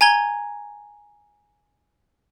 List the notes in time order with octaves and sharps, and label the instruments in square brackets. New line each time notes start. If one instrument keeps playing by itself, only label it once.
[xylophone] G#5 A#5 G#6 G7